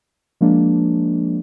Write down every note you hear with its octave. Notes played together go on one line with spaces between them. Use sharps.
F3 G#3 A#3 D4